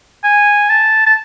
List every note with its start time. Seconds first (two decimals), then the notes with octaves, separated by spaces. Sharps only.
0.24 G#5
0.70 A5
1.06 A5